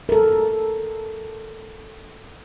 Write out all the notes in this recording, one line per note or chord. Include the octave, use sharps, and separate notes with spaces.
A4 A#4